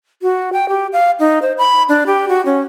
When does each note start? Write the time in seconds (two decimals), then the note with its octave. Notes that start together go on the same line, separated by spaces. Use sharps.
0.22 F#4
0.53 G5
0.69 G4
0.93 F5
1.19 D#4
1.42 C5
1.58 B5
1.89 D4
2.06 G4
2.28 F#4
2.46 C#4